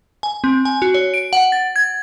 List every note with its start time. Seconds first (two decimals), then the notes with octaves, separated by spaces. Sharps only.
0.23 G#5
0.44 C4
0.65 G#5
0.82 F#4
0.94 C#5
1.14 D7
1.33 F#5
1.52 A6
1.76 G#6